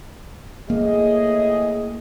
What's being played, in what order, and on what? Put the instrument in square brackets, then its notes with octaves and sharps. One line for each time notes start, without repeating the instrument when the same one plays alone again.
[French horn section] A2 G#4 D#5 [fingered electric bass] A#3